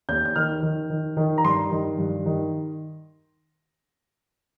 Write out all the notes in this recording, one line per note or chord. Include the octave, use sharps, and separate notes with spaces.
D#2 G6
G6
D#3 F6
D#3
D#3
D#3
A#5
G2 C6
D#3
G2
D#3